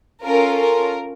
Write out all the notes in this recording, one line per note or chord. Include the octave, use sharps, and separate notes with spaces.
C#4 F4 A4 A#4
A#4